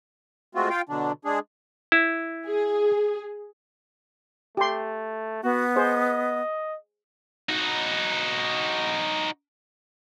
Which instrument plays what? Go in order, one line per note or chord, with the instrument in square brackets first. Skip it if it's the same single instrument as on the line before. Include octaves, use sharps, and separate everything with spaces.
[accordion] G#3 A3 C4 F4 F#4
F4 F5 G5
B2 D3 F#3 D4
G#3 D4 G#4
[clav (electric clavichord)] E4
[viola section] G#4
[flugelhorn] A3 [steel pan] G4 C6
[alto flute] B3 [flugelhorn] F#4
[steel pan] G#4 C5 [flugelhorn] D#5
[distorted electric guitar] D#4 F#4